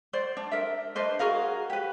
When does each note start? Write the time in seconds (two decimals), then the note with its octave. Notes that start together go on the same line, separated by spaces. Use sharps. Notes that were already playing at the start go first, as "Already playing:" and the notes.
0.13 C5 D5
0.37 D4
0.52 A#4 E5
0.95 D4 B4 C5 D#5
1.19 F#4 G#4 A#4 F5
1.70 G4 B4